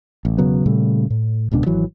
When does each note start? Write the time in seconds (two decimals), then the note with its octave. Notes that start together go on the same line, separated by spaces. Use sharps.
0.25 A1
0.38 E1 C#3 F#3 B3
0.66 A#2 C#3 G3 A3
1.10 A2
1.51 D1 C#2 B2 D4
1.66 G#1 E3 F#3